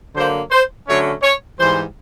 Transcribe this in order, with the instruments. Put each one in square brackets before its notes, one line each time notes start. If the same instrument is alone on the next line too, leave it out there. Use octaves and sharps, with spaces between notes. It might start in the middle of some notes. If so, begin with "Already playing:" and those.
[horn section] D3 F#3 A#3 C5
C5
D3 F#3 A3 C#4 C#5
C#5
G#2 E3 G3 C5